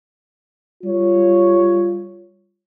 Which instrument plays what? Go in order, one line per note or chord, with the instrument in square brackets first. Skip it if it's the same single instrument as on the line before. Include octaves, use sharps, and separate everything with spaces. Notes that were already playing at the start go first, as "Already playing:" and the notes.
[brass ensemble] G3 F4 C#5